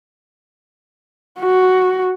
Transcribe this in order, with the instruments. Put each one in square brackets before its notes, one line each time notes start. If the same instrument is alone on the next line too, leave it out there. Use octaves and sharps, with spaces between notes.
[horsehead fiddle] F#4